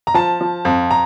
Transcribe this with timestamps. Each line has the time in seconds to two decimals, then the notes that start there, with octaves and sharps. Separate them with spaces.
0.07 A#5
0.14 F3 A5
0.41 F3
0.65 F2
0.91 A#5